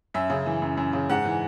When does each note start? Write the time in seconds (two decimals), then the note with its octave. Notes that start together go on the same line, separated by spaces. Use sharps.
0.14 F#2 E5
0.30 C#3
0.46 E3
0.62 F#2
0.77 F#2
0.93 C#3
1.10 G#2 F#5
1.25 E3